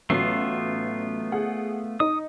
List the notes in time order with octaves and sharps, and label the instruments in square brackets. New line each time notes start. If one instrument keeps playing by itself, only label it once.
[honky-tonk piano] A1 F#3 C7 [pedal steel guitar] A3 B3 F4
[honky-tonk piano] G#4 F#5
[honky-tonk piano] D#4 [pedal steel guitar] D#6